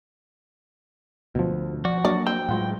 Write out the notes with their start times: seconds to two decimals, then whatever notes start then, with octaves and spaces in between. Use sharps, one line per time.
1.35 D2 B2 F3
1.85 F3 F#4 D5
2.05 F#3 A#3 D4 D5
2.27 C4 G5
2.49 A2 F#3 G#3 F4 F#5